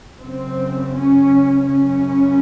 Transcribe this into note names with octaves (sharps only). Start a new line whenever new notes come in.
F#2 C#3 C4
C#4
F#2 C#3 C#4